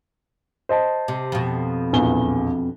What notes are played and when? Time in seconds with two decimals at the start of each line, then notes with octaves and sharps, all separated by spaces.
0.69 C5 D#5 A5
1.08 C3
1.32 F2 B2
1.93 A#1 E2 G7